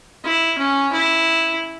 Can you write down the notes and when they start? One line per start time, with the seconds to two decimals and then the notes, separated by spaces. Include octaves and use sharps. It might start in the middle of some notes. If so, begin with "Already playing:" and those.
0.24 E4
0.58 C#4
0.93 E4